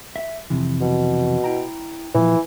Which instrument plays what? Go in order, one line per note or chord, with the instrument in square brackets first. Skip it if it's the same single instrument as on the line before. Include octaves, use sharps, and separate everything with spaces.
[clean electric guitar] E5
F2 C3 E3
[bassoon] B2
[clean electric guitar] E4 G5 A#5
[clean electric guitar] A#2 F3 [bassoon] E3